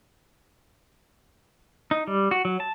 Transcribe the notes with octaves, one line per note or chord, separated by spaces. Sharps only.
D#4
G3
F#4
F#3
A5